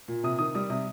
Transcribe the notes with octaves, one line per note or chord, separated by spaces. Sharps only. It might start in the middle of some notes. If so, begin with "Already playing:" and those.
A#2
C3 D#6
D#3 D#6
G3 D#6
C3 D#6